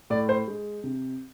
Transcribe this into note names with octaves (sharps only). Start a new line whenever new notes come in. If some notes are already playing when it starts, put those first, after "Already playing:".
A2 D5
C5
G#3
C3